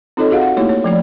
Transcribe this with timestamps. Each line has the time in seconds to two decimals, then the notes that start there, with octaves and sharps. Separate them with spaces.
0.17 C4 D#4 F4 A4 C#5 D#5
0.30 F#4 G#4 D#5 F5 F#5
0.42 F#5
0.57 A3 A#3 D#4 E4 G4 C#5
0.69 C#5
0.84 F3 A3 D5